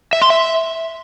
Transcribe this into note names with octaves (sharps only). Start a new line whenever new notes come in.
E5
C6
E5